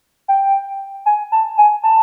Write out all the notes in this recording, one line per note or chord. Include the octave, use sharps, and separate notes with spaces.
G5
G#5
A5
G#5
A5